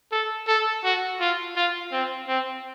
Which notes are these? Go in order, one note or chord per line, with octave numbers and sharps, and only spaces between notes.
A4
A4
F#4
F4
F4
C4
C4